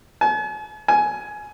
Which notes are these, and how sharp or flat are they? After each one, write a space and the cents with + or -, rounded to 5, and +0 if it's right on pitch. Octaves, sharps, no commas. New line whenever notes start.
G#5 +45
G#5 +15